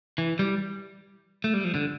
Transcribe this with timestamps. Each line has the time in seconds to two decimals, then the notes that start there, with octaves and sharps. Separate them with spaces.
0.18 E3
0.39 G3
1.44 A3
1.54 G3
1.64 F3
1.75 D3